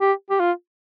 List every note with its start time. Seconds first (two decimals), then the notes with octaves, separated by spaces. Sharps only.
0.01 G4
0.30 G4
0.40 F4